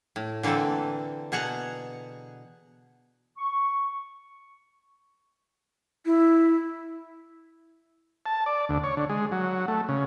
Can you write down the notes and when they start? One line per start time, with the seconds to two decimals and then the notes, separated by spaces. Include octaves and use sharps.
0.16 A2
0.43 D3 E3 A#3 C4 A4
1.32 B2 G#4 F#5 A5 A#5
3.37 C#6
6.06 E4
8.26 A5
8.46 D5
8.69 D2
8.84 C#5
8.97 D3
9.09 G#3
9.32 F#3
9.68 A3
9.89 C#3